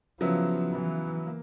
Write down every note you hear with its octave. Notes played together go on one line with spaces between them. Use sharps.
C#3 F3 F#3 B3 E4
E3
A#3